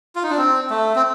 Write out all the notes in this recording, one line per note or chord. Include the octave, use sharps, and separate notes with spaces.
F4
D#4
D4
C4
A3
C4